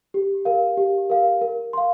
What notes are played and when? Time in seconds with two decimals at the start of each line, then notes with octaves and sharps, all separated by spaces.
0.14 G4
0.45 A#4 F5
0.77 G4
1.10 A#4 F5
1.41 A#4
1.73 F5 C6